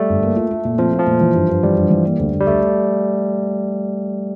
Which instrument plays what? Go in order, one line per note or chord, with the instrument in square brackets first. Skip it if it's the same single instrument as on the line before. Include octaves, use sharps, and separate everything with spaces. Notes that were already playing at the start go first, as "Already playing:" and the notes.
Already playing: [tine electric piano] G3 A3
[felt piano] G1
A#3
F4
A3
A#2
[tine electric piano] F3 [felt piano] C4
[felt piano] F4
[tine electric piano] F3
[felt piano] A#2
E3
G2
G2
[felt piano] E3 [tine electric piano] G3
[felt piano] G2
E3
A#3
D2
D2
[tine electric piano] G3
[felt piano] D2 [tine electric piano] A3